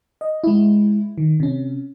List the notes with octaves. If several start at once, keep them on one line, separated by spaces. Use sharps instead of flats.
D#5
G#3 E4
D#3
C3 C#4